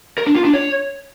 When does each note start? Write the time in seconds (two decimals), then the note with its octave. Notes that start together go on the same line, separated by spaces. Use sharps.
0.18 A#4
0.27 D4
0.36 F4
0.45 D4
0.53 C#5